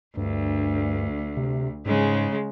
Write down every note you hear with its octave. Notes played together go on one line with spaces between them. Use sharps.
D2 G2
C3
G#2 C#3 G#3